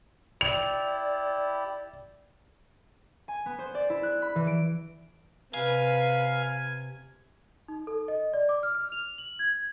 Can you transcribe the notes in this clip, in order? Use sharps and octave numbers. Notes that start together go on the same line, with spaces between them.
E4 G4 D5 F7
G#5
B3
C5
D5
E4
F#6
B5
E3
D7
C3 B4 F5 G#5
D#4
A4
D#5
D5
D6
F6
F6
F7
F#7
G#6